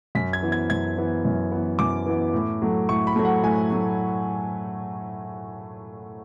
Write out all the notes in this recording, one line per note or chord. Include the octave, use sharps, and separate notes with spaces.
F#2 B6
G#6
E3 B3
G#6
F#2 G#6
E3 B3
F#2
E3 B3
F#2 D6
E3 B3
A2
F#3 A3
A2 C#6
B5
F#3 A3
F#5
A2 G#5
F#3 A3